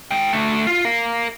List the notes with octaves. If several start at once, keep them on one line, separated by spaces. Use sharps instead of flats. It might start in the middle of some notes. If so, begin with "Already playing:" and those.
G#3 G5
D3 A3
F4
A#4 F5